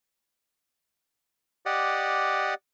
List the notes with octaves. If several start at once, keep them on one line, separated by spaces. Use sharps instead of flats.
G4 D5 D#5 F#5